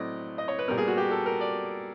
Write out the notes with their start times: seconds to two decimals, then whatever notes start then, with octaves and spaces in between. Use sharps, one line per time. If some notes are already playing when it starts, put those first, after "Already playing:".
Already playing: A2 F#3 A3 C4 D5 D#5
0.38 D#5
0.48 C#5
0.59 B4
0.68 A#2 G3 B3 A#4
0.78 G#4
0.87 F#4
0.97 G4
1.11 A4
1.26 A#4
1.41 D5